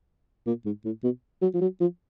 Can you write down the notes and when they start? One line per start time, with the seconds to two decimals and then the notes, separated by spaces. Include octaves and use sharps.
0.47 A#2
0.65 G#2
0.85 A2
1.04 B2
1.42 F#3
1.54 F3
1.61 F#3
1.80 F3